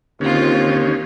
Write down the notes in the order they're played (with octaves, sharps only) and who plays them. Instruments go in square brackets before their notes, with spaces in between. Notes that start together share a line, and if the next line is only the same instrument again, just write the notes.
[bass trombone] D#2 [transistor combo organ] D3 D#3 C#4 [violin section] C4 F4